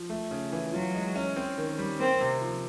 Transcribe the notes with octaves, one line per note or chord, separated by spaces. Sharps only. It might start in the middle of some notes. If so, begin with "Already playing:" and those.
Already playing: F3
A3
C#3
E3
F#3 F4
G#3
C#4
C4
D#3
G3
A#3 C4
C3
F3